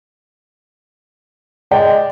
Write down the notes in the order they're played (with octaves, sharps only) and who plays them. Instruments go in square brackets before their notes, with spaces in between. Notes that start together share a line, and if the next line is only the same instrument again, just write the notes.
[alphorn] G#3 [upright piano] D5 G5